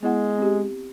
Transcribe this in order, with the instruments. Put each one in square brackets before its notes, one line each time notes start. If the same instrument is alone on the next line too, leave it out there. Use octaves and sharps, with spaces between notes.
[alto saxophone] G#3 [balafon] B3 E4 F#5
[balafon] C4 G4